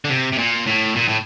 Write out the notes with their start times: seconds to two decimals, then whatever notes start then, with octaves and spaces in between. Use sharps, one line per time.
0.05 D3
0.09 C3
0.33 C3
0.38 A#2
0.67 A2
0.96 A#2
1.08 A2